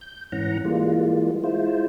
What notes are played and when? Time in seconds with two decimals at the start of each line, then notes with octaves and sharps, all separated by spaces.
0.01 G6
0.32 G#2 E3 C#4 F#5 A#5
0.65 E3 G3 G#3 A#3 F4
1.44 G#3 E4 F4 C5